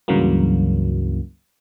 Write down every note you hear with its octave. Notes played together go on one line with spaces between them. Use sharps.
C#2 G2 C#3 E3 F#3 A#3